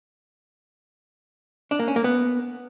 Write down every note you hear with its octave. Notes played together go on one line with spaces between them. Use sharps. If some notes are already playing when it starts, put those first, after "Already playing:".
D4
A#3
C#4
A#3
B3